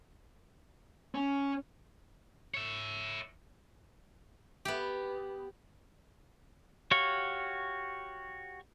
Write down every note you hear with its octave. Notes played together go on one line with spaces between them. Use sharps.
C#4
C#5 E5
B3 G4
F#4 G4 C#5 F5 C#6